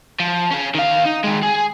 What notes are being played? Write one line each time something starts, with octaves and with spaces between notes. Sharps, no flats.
F3
C#4 G#4
D#3 F5
D#4
D#3 G#3
G#4